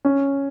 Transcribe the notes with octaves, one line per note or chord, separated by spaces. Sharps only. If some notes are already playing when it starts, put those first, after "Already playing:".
C#4